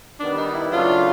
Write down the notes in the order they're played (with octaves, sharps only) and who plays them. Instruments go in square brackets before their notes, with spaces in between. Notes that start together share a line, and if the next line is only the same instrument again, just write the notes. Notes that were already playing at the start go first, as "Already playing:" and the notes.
[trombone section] D#3 G3 B3 [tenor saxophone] D4
[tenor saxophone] D#4
E4
[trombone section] C#3 F#3 A3 D4 [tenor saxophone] F4